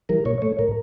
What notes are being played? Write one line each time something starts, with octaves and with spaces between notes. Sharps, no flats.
E3 G3 A#4
A#2 C#5
A3 C#5
A2 A#4